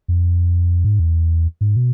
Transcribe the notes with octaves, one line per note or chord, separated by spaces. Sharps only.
F2
G#2
E2
G#2
B2